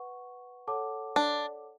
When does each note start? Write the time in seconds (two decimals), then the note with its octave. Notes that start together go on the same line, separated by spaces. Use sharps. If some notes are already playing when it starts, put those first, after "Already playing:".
Already playing: B4 F#5 C#6
0.67 A4 C#5 F#5 A5 D6
1.16 D4